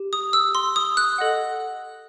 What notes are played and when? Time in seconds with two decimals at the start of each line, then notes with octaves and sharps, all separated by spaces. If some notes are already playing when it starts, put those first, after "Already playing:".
Already playing: G4
0.13 D#6
0.33 E6
0.55 C6
0.76 D#6
0.97 F#6
1.18 A4 D#5 F#5